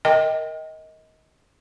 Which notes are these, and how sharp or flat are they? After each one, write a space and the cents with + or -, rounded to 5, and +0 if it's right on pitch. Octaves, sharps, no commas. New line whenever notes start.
A#4 +0 D#5 +25 G5 +0